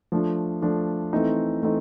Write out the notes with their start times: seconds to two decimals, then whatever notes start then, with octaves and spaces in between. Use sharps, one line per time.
0.12 F3 A3 D4
0.62 F3 A3 D4
1.13 E3 A3 C4 D#4
1.63 E3 A3 C4 D#4